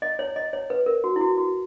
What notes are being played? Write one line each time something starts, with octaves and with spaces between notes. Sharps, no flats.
D#5
C#5
D#5
C#5
B4
A#4
F#4
E4
F#4
F#4